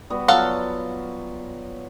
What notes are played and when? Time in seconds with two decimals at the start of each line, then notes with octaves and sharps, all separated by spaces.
0.10 G3 B3 F#4
0.28 F#3 B3 F4 A4 F5 F#5